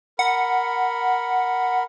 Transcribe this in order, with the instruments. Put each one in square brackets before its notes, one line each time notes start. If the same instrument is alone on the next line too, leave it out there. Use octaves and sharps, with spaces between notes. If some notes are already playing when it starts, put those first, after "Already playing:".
[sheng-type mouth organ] A#4 B5 [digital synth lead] F#5